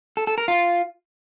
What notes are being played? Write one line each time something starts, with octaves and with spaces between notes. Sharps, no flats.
A4
A4
A#4
F4